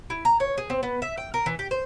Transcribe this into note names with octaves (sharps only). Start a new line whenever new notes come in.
E4
A#5
C#5
G#4
C4
B3
E5
G5
A#4
E3
G4
C5